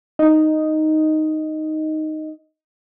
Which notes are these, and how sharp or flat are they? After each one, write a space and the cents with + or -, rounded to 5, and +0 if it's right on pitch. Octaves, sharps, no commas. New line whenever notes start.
D#4 +0 D#5 +0